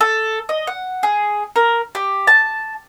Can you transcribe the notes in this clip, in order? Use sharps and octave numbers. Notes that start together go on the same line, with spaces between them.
A4
D#5
F#5
G#4
A#4
G4
A5